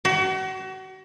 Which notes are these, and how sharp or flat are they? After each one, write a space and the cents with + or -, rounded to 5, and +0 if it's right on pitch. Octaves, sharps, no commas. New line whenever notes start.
F#4 +35